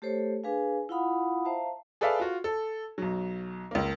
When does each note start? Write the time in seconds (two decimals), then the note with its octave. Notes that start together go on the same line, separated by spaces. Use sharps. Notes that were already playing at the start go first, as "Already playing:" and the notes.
0.02 A3 G4 A4 C5 C#5
0.44 D4 G#4 B4 F5 G#5
0.89 E4 F4 F5 F#5 B5 D#6
1.45 C5 E5 F5 A5 A#5
2.01 G#4 A4 B4 D5 E5 F5
2.20 F4 F#4
2.44 A4
2.98 B1 F#3
3.71 C#2 A#3